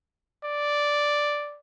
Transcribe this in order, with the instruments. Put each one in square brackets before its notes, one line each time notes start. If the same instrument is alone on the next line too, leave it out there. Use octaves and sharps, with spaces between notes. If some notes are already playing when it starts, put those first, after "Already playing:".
[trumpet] D5